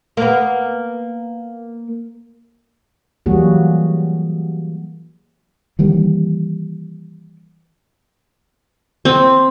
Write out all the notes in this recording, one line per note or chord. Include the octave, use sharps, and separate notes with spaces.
A#3 B3
E3 F#3 G3 A#3 F#4 G#4
D#3 E3 G3 A#3
C4